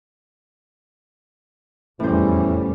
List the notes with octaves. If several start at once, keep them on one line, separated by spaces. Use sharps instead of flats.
F1 E2 A2 E3 G3 C#4 C5